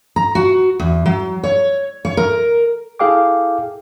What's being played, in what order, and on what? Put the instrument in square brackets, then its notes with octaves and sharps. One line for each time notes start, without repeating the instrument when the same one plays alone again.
[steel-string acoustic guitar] A#5
F#4
E2
F#3
C#5
C#5
A#4
[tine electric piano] E4 G#4 A4 F5 G5 D6